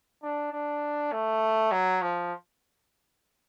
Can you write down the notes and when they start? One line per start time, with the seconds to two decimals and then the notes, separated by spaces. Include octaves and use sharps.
0.23 D4
0.53 D4
1.12 A3
1.72 F#3
2.02 F3